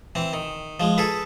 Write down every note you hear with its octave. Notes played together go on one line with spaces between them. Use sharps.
E3 C4
D#3
F3 G#3
G#4 A4 B4